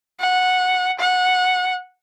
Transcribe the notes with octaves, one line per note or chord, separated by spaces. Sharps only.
F#5
F#5